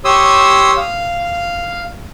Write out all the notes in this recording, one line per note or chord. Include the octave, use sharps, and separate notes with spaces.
G4 C#5 C6 D#6 E6
F5